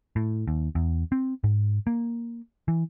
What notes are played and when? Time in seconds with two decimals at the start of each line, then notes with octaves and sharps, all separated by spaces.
0.16 A2
0.48 D#2
0.75 E2
1.12 C4
1.44 G#2
1.87 A#3
2.68 E3